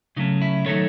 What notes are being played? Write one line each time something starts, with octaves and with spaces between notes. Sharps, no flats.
C#3 F#3 A3 C#4 D#4
E4
D#3 F#3 A3 D#4 A4 C#5